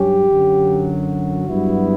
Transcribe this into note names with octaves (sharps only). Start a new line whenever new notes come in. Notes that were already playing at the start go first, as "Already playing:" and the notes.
Already playing: G2 F#3 C#4 G4
F#2 D3 F#3
F#4
G2 F#3 B3 E4